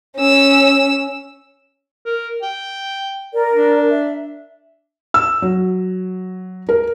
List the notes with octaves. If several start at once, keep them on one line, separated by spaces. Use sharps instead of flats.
C#4 E6
A#4
G5
A#4 D5
D4
E5
E6
F#3
A#4